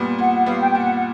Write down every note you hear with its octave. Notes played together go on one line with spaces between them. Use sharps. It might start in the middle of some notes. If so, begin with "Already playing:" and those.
Already playing: A#2 G3 B3
A#2 F#5
F#5
G3 B3 F5
G5
G5
A#2 F#5
F#5